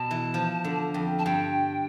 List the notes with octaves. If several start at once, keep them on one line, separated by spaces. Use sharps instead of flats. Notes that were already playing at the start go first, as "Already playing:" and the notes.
Already playing: B2 A5
E3
F3
D3
F2
A5
G2 G5